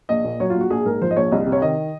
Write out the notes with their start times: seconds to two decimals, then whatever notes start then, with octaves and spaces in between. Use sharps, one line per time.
0.09 A#1 D#5
0.24 A#2
0.40 F#3 C#5
0.50 F4
0.55 A#1
0.61 F#4
0.71 A#1 G#4
0.86 G#2 A#4
1.02 F3 C5
1.11 D#5
1.16 A#1 C#5
1.32 C2 D#5
1.47 C3
1.52 C#5
1.62 D#3 D#5